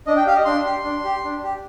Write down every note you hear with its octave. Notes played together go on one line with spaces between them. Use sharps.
D4 D#5
G5
G4 F5
D#5
D4 C6
G4
D4
G4
D4
G4